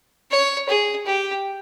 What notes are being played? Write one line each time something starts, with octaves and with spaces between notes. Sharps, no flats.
C#5
G#4
G4